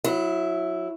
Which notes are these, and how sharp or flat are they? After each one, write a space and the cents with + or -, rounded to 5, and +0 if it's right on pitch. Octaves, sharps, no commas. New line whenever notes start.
F#3 -20 E4 +0